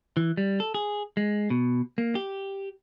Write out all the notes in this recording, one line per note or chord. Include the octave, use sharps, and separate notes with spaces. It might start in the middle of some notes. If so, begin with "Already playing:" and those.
E3
G3
A4
G#4
G#3
B2
A#3
G4